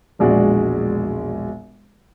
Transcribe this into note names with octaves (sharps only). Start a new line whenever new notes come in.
E1 A#1 G#3 F#4 D5